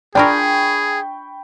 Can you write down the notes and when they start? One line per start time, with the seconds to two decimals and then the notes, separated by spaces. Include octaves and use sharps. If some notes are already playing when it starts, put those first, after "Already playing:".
0.15 D4 F4 G#4 A#4 G5 B5 C#6